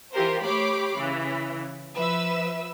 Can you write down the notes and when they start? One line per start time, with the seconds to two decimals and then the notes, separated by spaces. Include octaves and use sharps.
0.13 E3 F4 G4 A#4 C5
0.44 A3 G4 C#5 B5 D6 C7
0.98 C#3 E3
1.95 F3 B4 E5 E6